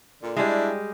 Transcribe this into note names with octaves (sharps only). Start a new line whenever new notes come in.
A#2 D3
G3 G#3 D4 E4